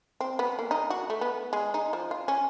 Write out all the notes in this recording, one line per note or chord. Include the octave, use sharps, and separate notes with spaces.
C4
B3
A#3
D#4
F#4
A3
B3
G#3
D#4
F3
F4
C#4